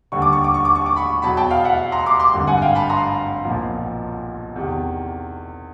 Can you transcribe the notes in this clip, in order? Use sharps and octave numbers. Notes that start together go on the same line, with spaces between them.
D#2 D3 G3 C#6
D6
C#6
D6
C#6
D6
C#6
D6
B5 C#6
E2 B2 F#3 A5 B5
G5 A5
F5 G5
E5 F#5
A#5 C6
C6 D6
C6 D6
G#1 G2 D3
F#5 G#5
F5 G5
A5 B5
A#5 C6
B1 A#2 F3
E2 C3 D#3